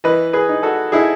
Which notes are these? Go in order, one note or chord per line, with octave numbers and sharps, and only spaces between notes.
E3 B4 D#5
G#4 B4
D#4
F#4 A4
D#4 E4 G#4